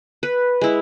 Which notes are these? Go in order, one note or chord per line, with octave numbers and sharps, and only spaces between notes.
B4
G#3 E4